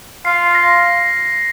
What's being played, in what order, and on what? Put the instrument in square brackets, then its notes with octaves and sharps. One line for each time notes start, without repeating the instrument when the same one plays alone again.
[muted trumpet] F4 [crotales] C7
[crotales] A#6